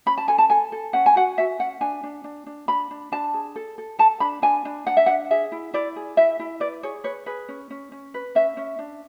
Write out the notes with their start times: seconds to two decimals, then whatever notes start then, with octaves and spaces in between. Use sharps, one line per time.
0.06 C#4 B5
0.18 A5
0.28 A4 G#5
0.38 A5
0.50 A4 G#5
0.72 A4
0.93 C#4 F#5
1.06 G#5
1.15 F#4 F#5
1.38 F#4 E5
1.59 C#4 F#5
1.81 D4 G#5
2.03 D4
2.24 D4
2.46 D4
2.68 D4 B5
2.91 D4
3.12 D4 A5
3.34 G#4
3.56 A4
3.78 A4
3.99 A4 A5
4.20 D4 B5
4.42 D4 G#5
4.65 D4
4.87 D4 F#5
4.97 E5
5.06 D4 F#5
5.31 G#4 E5
5.52 E4
5.74 E4 D5
5.96 G#4
6.17 E4 E5
6.39 E4
6.60 B4 D5
6.83 G#4 C#5
7.04 B4 C#5
7.26 G#4 B4
7.49 C#4
7.70 C#4
7.92 C#4
8.14 B4
8.35 C#4 E5
8.57 C#4
8.79 D4